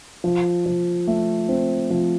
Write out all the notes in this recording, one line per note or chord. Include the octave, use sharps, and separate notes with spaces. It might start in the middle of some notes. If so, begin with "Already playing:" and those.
F3
F3
A3
C4
F3